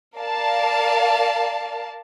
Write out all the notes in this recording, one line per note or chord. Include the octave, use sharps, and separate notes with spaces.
A#4 D5 F5 A5